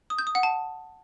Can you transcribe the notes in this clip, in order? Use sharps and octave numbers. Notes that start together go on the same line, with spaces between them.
D#6
G6
D#6
F#5
A5